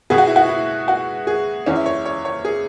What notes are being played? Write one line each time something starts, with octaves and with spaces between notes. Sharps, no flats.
B2 B3 G#4
F#4
E4
F#4
E4
F#4
G#4
E2 E3 C#4
E5
C#5
C#5
C#5
G#4